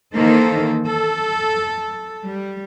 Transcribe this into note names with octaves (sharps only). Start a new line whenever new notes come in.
D#3 E3 A#3 D#4 A4 C5
A4
G3